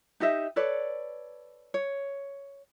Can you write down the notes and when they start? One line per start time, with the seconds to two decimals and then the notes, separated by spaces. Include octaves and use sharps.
0.20 D#4 G4 D#5 E5
0.56 A4 B4 C#5 D5
1.74 C#5